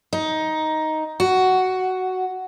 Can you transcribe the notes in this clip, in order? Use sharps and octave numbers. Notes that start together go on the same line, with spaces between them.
D#4
F#4